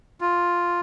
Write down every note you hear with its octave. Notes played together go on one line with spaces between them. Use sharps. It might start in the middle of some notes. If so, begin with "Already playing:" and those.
F4